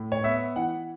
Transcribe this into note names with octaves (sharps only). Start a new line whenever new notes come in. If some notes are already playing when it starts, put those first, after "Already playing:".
Already playing: A2
C#5
B3 E5
E3 F#5